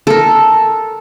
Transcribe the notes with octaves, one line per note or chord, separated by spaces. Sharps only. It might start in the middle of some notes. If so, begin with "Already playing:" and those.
A4 A#4